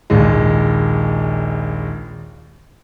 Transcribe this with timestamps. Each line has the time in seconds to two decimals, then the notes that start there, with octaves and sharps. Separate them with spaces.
0.10 A#1 D#2 G#3